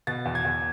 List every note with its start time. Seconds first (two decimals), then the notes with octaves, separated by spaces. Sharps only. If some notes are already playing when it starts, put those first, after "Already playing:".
0.07 B2 A6
0.25 E2
0.35 G#6
0.45 E2